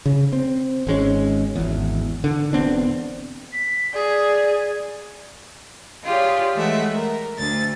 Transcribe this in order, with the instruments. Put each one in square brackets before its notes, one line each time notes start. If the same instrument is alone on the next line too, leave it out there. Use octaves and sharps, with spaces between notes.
[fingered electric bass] C#3
C4
G#1 G#3 C#4
G#1 E2
D3
E1 B3 C4 D4
[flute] B6
[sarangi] G#4 [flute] D5
[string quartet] F4 G4 G#4 C#5 D5
E3 G#3 A3 E5 F#5
A#4
D2 A6